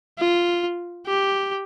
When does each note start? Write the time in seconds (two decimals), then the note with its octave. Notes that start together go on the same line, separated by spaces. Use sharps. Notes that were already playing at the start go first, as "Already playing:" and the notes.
0.18 F4
1.07 G4